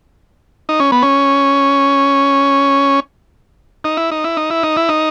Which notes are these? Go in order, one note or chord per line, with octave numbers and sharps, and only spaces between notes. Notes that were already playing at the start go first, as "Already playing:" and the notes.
D#4
C#4
B3
C#4
D#4
E4
D#4
E4
D#4
E4
D#4
E4
D#4